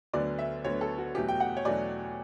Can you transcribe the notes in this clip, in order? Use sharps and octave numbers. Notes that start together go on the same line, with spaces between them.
D2 D3 F#3 B3 D5
E5
D2 D3 F#3 B3 C#5
A4
F#4
E2 B2 F#3 A3 G4
G5
F#5
C#5
E2 B2 F#3 A3 D5